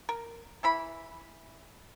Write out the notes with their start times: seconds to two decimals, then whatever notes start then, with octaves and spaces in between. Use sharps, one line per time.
0.09 A#4
0.63 E3 E4 B5